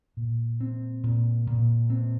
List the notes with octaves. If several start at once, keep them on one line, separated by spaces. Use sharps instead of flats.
A#2
C4
A#2
A#2
C4